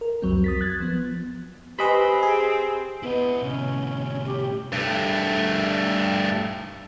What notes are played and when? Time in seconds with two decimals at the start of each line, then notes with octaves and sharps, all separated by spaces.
0.01 A#4
0.22 C2 F2 F#3 C4
0.44 D#6 A6 B6
0.61 F#6 G#6 A6
0.80 F3 B3
1.79 C4 G4 B4 D#5 G#5 B5
2.23 G#4
3.03 B3 E4 D#5
3.42 A2 C3 C#4
4.26 G4
4.72 G2 A3